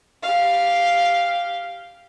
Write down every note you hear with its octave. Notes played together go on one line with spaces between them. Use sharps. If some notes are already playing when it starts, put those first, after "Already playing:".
G4 F5